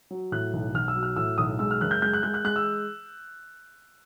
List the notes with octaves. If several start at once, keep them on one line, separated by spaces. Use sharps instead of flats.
F#3
A2 F#6
B1
B1 F6
E6
F#3
F6
A2 E6
B1 D#6
G#3 E6
F6
F#1 F#6
G6
G#3 G6
F#6
G#3 G6
F#6
G#3 F#6
E6